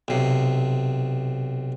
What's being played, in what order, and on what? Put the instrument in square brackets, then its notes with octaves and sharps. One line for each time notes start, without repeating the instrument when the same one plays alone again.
[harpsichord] B1 C3